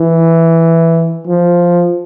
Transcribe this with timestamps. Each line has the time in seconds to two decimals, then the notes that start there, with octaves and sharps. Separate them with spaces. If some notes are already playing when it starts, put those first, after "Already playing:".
Already playing: E3
1.27 F3